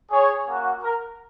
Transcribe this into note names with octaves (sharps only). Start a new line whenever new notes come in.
G#4 C#5
A#3 C#4 F#4
A#4